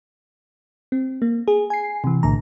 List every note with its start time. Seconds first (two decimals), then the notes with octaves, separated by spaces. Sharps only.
0.92 C4
1.22 A#3
1.48 G#4
1.70 G#5 C7
2.04 C3 E3
2.23 B1 A2 D3 A#5